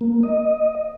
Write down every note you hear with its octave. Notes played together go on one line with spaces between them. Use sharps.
A#3
D#5